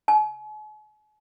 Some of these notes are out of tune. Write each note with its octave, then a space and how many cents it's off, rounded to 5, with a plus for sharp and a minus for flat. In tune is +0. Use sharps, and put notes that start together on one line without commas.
G#5 +45